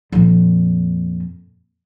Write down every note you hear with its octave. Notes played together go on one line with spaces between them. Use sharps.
F2 A#2